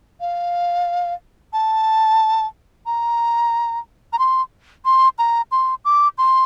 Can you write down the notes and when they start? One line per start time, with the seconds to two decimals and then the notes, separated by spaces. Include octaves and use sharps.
0.20 F5
1.53 A5
2.86 A#5
4.13 A#5
4.19 C6
4.85 C6
5.18 A#5
5.51 C6
5.85 D6
6.18 C6